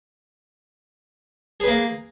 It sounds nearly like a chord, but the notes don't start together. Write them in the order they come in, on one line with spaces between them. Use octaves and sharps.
G#4 B4 A#3